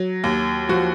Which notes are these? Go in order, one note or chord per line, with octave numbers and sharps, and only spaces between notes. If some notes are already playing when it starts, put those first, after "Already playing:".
Already playing: F#3
D#2
F3 F#4